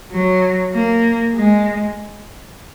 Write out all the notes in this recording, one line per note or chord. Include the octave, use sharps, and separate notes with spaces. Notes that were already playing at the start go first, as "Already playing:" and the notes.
F#3
A#3
G#3